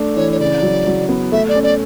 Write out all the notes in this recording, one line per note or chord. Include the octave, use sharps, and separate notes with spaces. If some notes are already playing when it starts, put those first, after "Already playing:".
Already playing: A3 D4 A4
E3 C#5
C#5
C#3 D5
F#3
F#3
B3
A3 E5
D5
C#4
D5